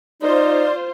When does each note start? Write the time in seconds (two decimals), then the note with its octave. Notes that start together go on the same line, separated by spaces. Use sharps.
0.22 D#4 F4 C5 D5